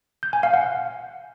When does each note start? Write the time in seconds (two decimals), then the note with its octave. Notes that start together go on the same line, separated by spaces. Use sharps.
0.23 G6
0.33 G#5
0.43 F5
0.53 F#5